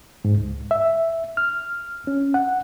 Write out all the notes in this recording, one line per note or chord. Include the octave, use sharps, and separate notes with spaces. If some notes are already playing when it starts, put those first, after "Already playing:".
G#2
C#2
E5
F6
C#4
F#5